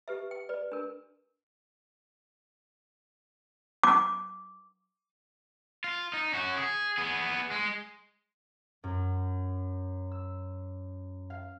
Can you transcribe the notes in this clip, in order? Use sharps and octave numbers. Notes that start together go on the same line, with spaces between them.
G4 B4 E5
G5
B4 D5
D4 A#4
D6
F4
D#4
C#4 F#4
G#4
B3 G#4
G#3
F#2
E6
F5